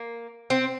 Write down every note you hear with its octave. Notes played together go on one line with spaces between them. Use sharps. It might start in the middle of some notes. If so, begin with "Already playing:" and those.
Already playing: A#3
C4